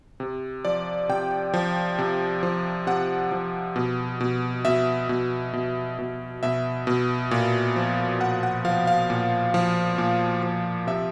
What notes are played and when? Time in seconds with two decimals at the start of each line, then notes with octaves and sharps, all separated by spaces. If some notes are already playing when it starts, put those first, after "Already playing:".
0.20 C3
0.65 F3 D5
1.09 C3 G5
1.54 F3
1.99 C3
2.43 F3
2.87 C3 F#5
3.32 F3
3.76 B2
4.21 B2
4.65 B2 E5
5.09 B2
5.53 B2
5.99 B2
6.43 B2 E5
6.87 B2
7.31 A#2
7.76 F3
8.20 A#2 F#5
8.43 F#5
8.65 F3 F5
8.87 F5
9.10 A#2
9.54 F3
9.98 A#2
10.43 F3
10.87 C3 E5